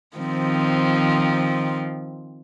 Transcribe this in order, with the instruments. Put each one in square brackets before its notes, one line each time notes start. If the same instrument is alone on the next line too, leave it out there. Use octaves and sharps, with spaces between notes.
[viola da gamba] D#3 F3 C4